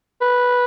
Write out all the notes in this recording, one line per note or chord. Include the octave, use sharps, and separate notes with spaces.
B4